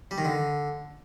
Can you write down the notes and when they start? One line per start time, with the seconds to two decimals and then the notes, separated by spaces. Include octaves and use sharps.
0.11 G3
0.18 D#3
0.25 D3